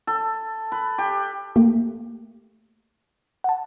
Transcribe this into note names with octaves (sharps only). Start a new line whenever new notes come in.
A4
B4
G4
A3 A#3 G4
F#5 A5